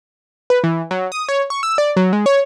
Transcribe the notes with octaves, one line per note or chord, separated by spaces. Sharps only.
B4
E3
F#3
D#6
C#5
C#6
E6
D5
F#3
G#3
C#5